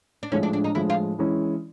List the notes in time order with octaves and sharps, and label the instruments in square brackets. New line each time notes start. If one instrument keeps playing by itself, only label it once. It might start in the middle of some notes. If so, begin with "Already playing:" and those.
[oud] D4
[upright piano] A2 F3 G#3 [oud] C#4
[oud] D4
D4
D#4
[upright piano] A2 F3 G#3 [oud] E4
[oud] F4
[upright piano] E3 G#3 C#4 E4